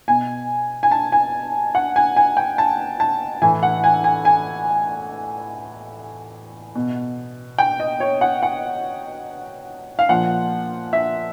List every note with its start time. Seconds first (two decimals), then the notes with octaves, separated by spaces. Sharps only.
0.08 B2 G#5
0.83 G#5
0.91 A5
1.12 G#5
1.75 F#5
1.96 G#5
2.16 G#5
2.37 G5
2.58 A5
3.00 A5
3.42 A2 E3 G#5
3.63 F#5
3.84 G#5
4.04 G#5
4.25 G#5
6.75 B2
7.59 G5
7.80 D#5
8.00 C#5
8.21 F#5
8.43 F#5
9.99 F5
10.09 A#2 F3 F#5
10.93 E5